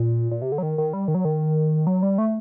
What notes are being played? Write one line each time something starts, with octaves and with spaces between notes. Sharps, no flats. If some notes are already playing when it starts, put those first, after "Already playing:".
Already playing: A#2
A#2
C3
D3
F#3
D#3
D#3
G3
D#3
F#3
D#3
F#3
G3
A3